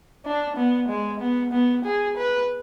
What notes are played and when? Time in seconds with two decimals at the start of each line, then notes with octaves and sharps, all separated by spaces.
0.25 D4
0.57 B3
0.89 G#3
1.20 B3
1.52 B3
1.85 G#4
2.17 B4